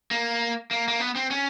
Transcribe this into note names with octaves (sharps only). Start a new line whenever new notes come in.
A#3
A#3
A#3
B3
C4
C#4